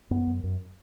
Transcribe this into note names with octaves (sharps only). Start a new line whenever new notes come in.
F#2 B3
F#2
F#2